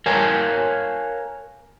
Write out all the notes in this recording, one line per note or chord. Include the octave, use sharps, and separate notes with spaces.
A#4 C#5 F5 G#5 A5